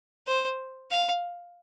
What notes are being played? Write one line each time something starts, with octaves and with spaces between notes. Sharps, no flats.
C5
F5